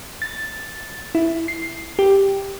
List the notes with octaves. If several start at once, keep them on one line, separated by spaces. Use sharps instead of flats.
A6
E4
C7
G4